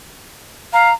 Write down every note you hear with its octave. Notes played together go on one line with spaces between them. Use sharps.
F5 A#5